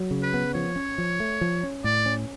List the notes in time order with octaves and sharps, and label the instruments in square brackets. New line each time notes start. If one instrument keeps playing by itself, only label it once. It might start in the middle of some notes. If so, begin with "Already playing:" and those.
Already playing: [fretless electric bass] F#3
C#3
[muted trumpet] B4
[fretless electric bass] B3
[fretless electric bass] F3 [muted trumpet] C#5
[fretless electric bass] C#4
F3
A3
F3
C#4
[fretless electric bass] A2 [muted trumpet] D5
[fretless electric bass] C#4